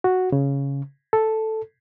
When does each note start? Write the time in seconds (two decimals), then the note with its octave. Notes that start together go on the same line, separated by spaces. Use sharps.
0.04 F#4
0.32 C#3
1.13 A4